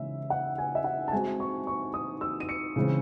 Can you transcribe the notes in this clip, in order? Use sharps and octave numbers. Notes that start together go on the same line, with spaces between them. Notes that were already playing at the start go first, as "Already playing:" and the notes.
Already playing: C#3 E3 G#3 E5
F#5
G#5
E5
F#5
A5
G#3 C4 F#4 G#5
C#6
C#6
D#6
E6
D#7
C#7
C#3 E3 G#3 C4